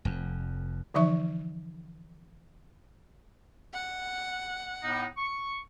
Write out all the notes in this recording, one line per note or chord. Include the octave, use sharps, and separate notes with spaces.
F1 F2
D3 E3 F3 D#4 E5 C#6
F#5
A2 B3 D#4
C#6